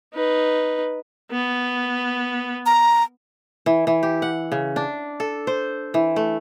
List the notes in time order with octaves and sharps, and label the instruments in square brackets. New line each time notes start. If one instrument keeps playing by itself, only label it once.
[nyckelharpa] D#4 B4
[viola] B3
[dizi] A#5
[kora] E3
E3
G4
F#5
C#3
D4
A4
C5
E3
A3